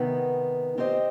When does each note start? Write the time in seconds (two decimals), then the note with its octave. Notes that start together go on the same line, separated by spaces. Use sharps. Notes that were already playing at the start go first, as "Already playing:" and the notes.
Already playing: C3 D#3 B3
0.78 C4 G4 C5 D#5